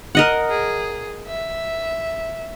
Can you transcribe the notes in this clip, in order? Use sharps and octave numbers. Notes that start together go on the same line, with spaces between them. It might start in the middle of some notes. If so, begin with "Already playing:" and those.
A#4 D#5 F#5
G#4
E5